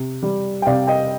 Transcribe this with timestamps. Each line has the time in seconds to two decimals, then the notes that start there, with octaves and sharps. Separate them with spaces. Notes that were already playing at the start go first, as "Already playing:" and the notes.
Already playing: C3
0.23 G3
0.62 G5
0.66 C3 D5 F5
0.87 D#5 G5